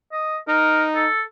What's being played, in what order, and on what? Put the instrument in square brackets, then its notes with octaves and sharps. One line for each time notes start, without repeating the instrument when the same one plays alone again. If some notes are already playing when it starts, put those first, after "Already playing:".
[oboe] D#5
[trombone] D#4 [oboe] A#4
[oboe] A4